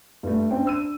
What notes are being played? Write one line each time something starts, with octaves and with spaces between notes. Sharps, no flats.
G2 A3
C4 D4 C5 G5
D4 E6 D#7